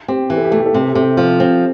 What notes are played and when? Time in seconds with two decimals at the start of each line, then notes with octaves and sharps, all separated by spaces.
0.08 C4 G4
0.30 E3 G4
0.37 A4
0.45 G4
0.51 A3 A4
0.59 G4
0.66 A4
0.74 C3 G4
0.81 A4
0.88 G4
0.95 C3 A4
1.02 G4
1.17 F3 F4
1.40 C4